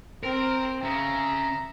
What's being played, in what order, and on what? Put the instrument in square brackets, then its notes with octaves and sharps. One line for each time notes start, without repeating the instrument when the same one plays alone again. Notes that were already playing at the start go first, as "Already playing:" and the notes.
[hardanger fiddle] C4 [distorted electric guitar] A#4
[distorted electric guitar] C#3 [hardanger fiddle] E5 [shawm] A#5